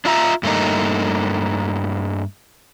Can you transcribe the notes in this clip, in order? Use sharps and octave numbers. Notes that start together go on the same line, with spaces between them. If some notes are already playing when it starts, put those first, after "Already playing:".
D4 F4 E5 A#5
G2 A3 A#3 D#4